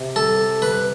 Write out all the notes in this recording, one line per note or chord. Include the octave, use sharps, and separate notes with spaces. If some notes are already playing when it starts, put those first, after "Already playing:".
Already playing: C3
A4
B4